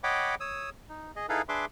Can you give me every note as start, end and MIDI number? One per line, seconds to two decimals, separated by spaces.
0.04 0.35 73
0.04 0.35 75
0.04 0.35 78
0.04 0.35 79
0.04 0.35 83
0.04 0.35 86
0.40 0.70 73
0.40 0.70 87
0.40 0.70 88
0.89 1.11 63
1.16 1.26 68
1.16 1.26 75
1.29 1.42 63
1.29 1.42 64
1.29 1.42 68
1.29 1.42 69
1.29 1.42 71
1.29 1.42 77
1.49 1.65 62
1.49 1.65 68
1.49 1.65 71
1.49 1.65 76
1.49 1.65 84
1.49 1.65 86